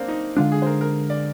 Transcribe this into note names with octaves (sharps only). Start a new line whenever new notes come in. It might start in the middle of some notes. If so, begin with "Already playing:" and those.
Already playing: A#3 C4 D4
D#4
D3 G#3 D4 F4
G#4
C5
A#4
A#4
D5